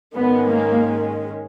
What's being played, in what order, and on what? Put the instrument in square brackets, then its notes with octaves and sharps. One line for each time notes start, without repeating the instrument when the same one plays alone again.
[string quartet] G#2 D#3 G#3 C#4 [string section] B3
[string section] A#3